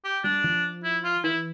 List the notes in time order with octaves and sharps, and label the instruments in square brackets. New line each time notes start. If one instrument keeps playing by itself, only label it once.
[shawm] G4
[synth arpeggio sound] G3 [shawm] D4
[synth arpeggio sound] F3
[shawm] E4
F4
[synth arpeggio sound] E3 [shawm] E4